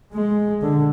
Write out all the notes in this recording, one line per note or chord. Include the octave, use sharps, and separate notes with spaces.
G#3
D3